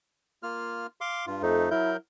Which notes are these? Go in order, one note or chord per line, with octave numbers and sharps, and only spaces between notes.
A#3 F4 F6
F5 C6 D6
G2 F4
F2 A3 D#4
F#3 E4 A#4 G6